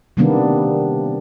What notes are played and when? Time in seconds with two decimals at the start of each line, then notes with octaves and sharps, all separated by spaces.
0.17 C3 D#3 G3 A#3 B3 D4